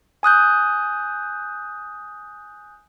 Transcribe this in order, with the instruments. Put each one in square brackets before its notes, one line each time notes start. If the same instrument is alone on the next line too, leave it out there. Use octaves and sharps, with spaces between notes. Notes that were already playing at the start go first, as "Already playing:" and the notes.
[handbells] G#5 D#6 F#6 G6